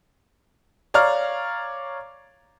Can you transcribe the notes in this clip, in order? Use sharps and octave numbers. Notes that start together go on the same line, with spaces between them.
C#5 D5 F5 A#5 F6